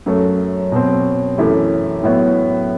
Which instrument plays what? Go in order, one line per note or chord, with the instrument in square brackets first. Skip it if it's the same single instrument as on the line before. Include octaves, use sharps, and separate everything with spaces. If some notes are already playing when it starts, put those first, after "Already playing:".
[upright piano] F#2 F#3 A3
B2 F#3 C4
F#2 E3 A3 E4 G4
A2 F#3 B3 E4